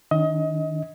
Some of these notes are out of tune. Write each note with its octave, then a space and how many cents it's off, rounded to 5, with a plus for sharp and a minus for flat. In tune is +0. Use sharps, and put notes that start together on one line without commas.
D#3 +5 D4 -35 D#5 +30